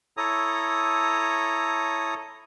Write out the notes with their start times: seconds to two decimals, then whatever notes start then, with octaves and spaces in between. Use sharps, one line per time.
0.17 E4 A4 C#5 A#5 D#6